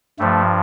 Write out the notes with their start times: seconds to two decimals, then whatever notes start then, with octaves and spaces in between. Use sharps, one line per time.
0.19 G2 F3 A3